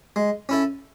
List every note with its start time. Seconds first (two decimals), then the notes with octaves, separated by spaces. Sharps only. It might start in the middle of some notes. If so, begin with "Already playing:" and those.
0.16 G#3
0.49 C#4 E4 A4